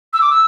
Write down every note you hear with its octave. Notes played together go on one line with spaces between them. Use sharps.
E6
D6
E6